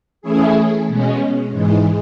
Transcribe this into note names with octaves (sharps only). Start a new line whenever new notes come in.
E3 A3 C#4 E4 G#4
B2 G#3 C#4
G#2 E3 G#3